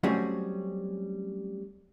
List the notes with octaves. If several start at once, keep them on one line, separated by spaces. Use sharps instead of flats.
F#3 G3 A3 C4 C#4 G#4